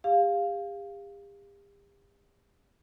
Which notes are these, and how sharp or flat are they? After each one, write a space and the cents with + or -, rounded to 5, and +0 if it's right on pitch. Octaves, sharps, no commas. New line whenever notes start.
G4 +40 F5 +0